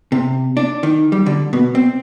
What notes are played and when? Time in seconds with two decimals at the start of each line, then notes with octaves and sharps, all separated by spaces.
0.12 C3
0.57 D4
0.83 D#3
1.12 G3
1.26 D3
1.53 B2
1.75 C4